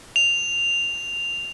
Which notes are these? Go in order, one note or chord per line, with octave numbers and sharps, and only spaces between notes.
F7